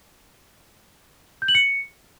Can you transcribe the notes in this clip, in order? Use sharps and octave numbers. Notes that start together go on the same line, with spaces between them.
G6
F#7
C#7